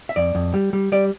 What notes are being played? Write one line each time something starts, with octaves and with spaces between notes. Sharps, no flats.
E5
F2 D5
F2
G3
G3
G3 D5